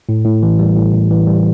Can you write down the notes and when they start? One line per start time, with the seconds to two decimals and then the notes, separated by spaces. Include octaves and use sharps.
0.09 A2
0.25 A2
0.43 E3
0.59 G3
0.77 A2
0.94 A2
1.10 E3
1.27 G3